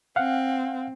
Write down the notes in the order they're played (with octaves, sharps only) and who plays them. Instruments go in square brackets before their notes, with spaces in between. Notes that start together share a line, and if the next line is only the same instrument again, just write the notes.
[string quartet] C4 [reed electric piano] F5 F#5